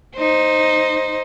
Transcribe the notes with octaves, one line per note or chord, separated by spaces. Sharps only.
D#4 C5